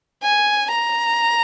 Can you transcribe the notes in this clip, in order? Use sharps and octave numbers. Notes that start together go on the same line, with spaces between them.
G#5
A#5